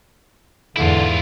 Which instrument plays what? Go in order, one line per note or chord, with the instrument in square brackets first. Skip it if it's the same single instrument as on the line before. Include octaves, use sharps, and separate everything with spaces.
[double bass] E2 G#2 [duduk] D3 [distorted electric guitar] E4 F4